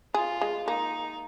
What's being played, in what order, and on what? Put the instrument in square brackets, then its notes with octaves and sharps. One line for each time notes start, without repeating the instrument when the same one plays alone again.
[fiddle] F4 [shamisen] G#4
[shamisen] G#3
[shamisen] A#3 [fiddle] D#4